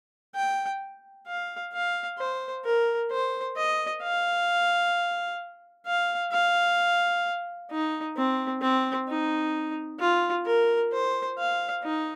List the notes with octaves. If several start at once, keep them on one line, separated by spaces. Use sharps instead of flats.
G5
F5
F5
C5
A#4
C5
D#5
F5
F5
F5
D#4
C4
C4
D#4
F4
A#4
C5
F5
D#4